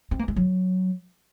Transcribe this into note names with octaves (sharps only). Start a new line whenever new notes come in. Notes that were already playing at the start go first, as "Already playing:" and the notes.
C4
A#3
G#3
F#3